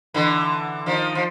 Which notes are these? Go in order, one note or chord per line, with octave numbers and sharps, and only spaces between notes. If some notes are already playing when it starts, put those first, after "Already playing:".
D3 E3
D#3 F3
F3